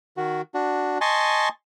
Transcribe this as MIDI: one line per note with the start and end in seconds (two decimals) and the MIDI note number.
0.17 0.42 51
0.17 0.42 66
0.54 0.98 62
0.54 0.98 66
1.01 1.49 75
1.01 1.49 80
1.01 1.49 81
1.01 1.49 84
1.01 1.49 85